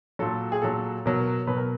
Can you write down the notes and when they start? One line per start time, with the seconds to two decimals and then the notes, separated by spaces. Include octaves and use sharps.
0.19 A#2 F#3 A4
0.52 G#4
0.62 A#2 F#3 A4
1.06 B2 F#3 A#4
1.47 B2 F#3 B4
1.57 A#4